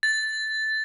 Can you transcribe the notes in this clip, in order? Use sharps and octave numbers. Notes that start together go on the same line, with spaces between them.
A6